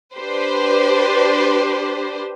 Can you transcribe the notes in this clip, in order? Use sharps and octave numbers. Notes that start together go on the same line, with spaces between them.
D4 G4 B4 C5